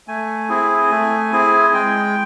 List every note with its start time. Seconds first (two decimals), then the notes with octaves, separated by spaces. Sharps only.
0.08 A3 G#5
0.49 C4 E4 G#4
0.90 A3
1.32 C4 E4 G#4
1.74 G#3 G5